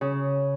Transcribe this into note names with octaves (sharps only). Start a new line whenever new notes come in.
C#3